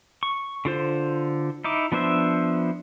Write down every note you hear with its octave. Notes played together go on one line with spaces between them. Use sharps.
C#6
D3 F4 C5
D#4 E4 D6
F3 B3 D4 C5 E5